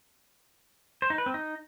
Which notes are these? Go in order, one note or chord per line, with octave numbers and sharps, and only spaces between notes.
C5
D#4
B4
C4
D#4